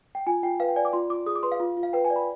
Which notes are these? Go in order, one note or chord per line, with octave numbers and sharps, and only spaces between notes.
G5
F4 G#5
F4 G5
B4 F5
G5
D5 G#5
D6
F4 C6
F4 D6
G#4 D#6
D6
B4 C6
F5
F4
F4
F5
B4 G5
G#5
D5
B5